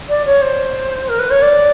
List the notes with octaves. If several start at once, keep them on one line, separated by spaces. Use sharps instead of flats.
D5
C#5
C5
A#4
B4
C#5
D5